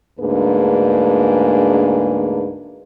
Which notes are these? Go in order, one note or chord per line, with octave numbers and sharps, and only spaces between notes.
D2 G#2 A#3 D4 G#4 B4